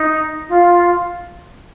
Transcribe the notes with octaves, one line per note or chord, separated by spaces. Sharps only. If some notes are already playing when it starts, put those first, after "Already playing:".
Already playing: D#4
F4